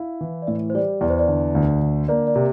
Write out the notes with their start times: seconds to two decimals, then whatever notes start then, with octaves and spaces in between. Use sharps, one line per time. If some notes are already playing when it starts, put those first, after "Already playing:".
Already playing: E4 F5
0.21 E3
0.42 D5
0.47 A2 E5
0.70 C5
0.75 G3 D5
1.01 E2 D5
1.10 C5
1.19 D5
1.28 D3
1.55 D2
1.81 D3
2.08 A#3 D5
2.27 D5
2.36 C3